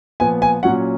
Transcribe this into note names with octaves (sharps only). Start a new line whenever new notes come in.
A#2 F3 B3 G#5
G#5
A#2 F#3 C#4 F#5